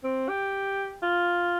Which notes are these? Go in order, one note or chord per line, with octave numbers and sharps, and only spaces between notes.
C4
G4
F4